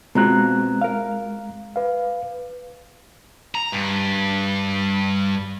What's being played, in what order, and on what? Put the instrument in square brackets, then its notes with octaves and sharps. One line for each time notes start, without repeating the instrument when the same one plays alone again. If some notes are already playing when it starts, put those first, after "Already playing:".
[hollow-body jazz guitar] B2 C4 F4 [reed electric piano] G#3 A#5 F#6
[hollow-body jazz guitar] A#4 F5
[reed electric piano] B4 F5
[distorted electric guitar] A#5
G2